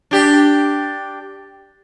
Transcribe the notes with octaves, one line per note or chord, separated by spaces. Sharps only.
D4 G4